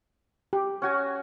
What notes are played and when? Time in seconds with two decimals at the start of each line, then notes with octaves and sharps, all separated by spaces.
0.53 G4
0.82 C#4 F#4 G#5